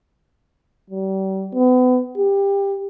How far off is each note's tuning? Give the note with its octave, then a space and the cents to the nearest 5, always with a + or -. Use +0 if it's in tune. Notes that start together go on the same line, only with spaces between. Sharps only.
G3 -35
B3 +35
G4 +20